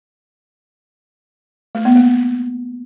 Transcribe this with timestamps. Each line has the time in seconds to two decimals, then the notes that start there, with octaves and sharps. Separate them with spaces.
1.75 A3
1.85 B3
1.96 A#3